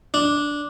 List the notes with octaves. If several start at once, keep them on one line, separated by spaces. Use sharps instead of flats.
D4